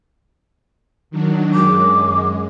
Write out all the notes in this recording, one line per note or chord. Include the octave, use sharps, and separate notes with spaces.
D#3 F#3 D4
F#2 G#3 D6